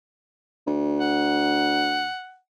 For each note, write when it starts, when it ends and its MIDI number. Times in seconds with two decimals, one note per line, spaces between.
0.67 2.10 38
1.00 2.38 78